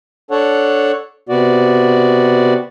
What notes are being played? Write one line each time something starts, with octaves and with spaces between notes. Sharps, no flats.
D4 A4 C#5 F#5
C3 B3 F#4 D5